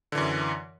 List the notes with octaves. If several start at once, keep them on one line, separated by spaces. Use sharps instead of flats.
F#2 D3 E3